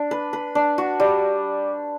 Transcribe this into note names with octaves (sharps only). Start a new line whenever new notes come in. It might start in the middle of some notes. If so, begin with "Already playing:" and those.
Already playing: D4
B4
B4
D4
F#4
G3